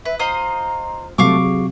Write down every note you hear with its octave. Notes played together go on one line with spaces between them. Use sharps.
B4 E5
F4 C5 D#5 A#5
C3 F#3 A3 F5 C#6 D6
G#4